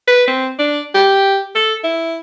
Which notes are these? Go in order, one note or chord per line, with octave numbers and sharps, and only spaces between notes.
B4
C4
D4
G4
A4
E4